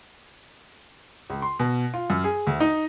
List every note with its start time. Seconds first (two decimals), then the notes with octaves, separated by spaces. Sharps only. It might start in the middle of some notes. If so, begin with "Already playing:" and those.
1.30 C#2
1.42 C6
1.59 B2
1.94 F4
2.10 F#2
2.24 G#4
2.47 D2
2.60 D#4